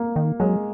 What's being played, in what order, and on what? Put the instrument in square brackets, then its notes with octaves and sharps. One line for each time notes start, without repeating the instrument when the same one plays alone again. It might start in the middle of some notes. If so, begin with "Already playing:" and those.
Already playing: [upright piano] A#3
[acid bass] D#3
[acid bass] F#3 [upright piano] G#3